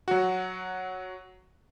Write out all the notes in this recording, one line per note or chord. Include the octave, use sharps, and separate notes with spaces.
F#3 F#4